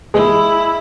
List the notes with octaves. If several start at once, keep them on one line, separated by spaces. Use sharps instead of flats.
G#3 E4